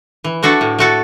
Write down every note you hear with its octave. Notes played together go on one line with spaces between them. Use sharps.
E3
A3 D4 F#4 A4
A2
A3 F#4 A4